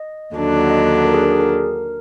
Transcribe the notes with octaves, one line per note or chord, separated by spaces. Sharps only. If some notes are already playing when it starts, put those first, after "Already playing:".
Already playing: D#5
D#2 D3 F#3 D4
D#5
A#4
G#4
A#4
G#4
A#4